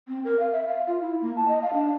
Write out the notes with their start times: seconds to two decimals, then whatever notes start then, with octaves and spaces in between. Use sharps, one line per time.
0.08 C4
0.25 A#4
0.40 F5
0.52 E5
0.67 F5
0.87 F4
1.01 E4
1.22 A#3
1.37 A5
1.48 D#5
1.62 F5
1.74 D4